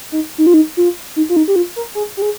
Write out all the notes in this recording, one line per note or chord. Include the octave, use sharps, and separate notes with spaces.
D#4
D#4
F4
D#4
F4
D#4
F4
D#4
G4
F4
A#4
G#4
G4
G#4